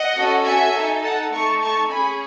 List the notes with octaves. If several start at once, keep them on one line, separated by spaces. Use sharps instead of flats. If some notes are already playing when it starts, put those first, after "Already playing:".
Already playing: D#5 F#5
C#4 F#4 A4
E5 G#5
D#4 A4
F#5 A5
A3 D#4 A4 A5 C#6
A5 C#6
C#4 G#4 G#5 B5